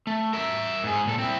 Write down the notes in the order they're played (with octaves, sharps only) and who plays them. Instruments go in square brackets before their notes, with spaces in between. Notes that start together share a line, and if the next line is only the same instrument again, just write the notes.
[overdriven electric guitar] A3
A#4 E5
G#2 G#4
A#2 A4
C4 E4